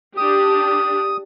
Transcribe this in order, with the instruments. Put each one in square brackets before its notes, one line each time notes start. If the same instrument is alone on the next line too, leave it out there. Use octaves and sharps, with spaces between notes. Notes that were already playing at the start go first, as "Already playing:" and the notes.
[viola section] D4 G4 [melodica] D#6